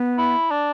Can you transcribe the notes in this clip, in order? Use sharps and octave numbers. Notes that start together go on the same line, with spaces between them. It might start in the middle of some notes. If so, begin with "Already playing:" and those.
Already playing: B3
E4
D4